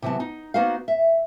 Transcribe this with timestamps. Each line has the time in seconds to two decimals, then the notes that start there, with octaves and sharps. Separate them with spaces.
0.02 C3 E3 F#3 B3 A5
0.20 D#4
0.54 A#3 B3 D#4 F#4 C5 F5
0.88 E5